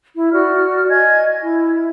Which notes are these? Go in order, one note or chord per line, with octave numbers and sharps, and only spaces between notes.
E4
F#4 D5 F6
D#5 G#5 G#6
E4